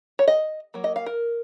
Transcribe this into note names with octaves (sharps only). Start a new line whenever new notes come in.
C#5
D#5
F#3 A#3
D#5
F5
A#4